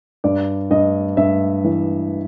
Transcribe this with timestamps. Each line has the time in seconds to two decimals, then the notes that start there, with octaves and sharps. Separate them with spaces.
0.24 G2 D5
0.71 G2 D#5
1.17 G2 E5
1.64 E3